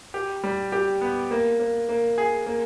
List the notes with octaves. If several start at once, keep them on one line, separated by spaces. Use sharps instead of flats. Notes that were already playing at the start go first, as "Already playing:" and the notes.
G4
G3
G4
B3
A#3
A#3
A#3
G#4
A#3